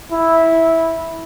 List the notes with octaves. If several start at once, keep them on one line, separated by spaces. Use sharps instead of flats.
E4